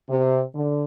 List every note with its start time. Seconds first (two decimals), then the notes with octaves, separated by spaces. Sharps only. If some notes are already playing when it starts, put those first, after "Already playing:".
0.10 C3
0.55 D3